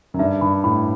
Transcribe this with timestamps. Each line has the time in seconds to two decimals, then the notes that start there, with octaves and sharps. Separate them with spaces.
0.14 F#2
0.19 G2 E5
0.41 G2 B5
0.64 A2 B5